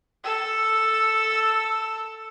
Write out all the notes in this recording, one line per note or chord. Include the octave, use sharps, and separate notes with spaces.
A4 E6